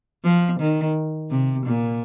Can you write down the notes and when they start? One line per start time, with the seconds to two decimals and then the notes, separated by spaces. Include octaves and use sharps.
0.24 F3
0.60 D#3
1.31 C3
1.66 A#2